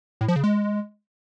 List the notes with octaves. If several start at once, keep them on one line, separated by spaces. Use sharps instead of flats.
A2
F3
C#3
G#3